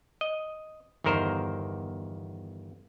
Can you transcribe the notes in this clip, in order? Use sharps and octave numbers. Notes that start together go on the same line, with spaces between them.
D#5
G1 E2 D#3 A#4 C5